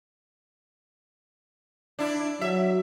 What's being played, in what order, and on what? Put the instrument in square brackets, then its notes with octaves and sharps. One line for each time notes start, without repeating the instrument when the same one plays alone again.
[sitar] D4 E4
[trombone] F#3 [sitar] E5